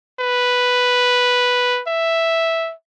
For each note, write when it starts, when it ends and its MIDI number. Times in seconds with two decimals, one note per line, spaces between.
0.19 1.81 71
1.87 2.73 76